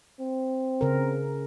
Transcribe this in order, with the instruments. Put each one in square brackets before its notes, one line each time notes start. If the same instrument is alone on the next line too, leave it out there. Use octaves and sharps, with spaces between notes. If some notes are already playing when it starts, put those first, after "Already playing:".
[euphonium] C4
[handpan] C#3 A#4